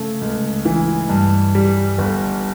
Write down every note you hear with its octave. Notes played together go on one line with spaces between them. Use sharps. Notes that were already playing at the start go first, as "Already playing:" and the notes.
Already playing: C#3 A3
C#2
E3
G2
G3
G1